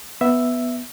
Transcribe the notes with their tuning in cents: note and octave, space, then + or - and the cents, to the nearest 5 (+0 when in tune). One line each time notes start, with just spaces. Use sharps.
B3 +0 E5 +0